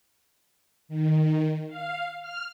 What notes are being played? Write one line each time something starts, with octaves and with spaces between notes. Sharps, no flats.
D#3
F5
F6